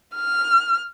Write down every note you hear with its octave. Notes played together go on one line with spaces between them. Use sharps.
F6